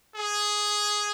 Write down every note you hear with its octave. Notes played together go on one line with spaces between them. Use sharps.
G#4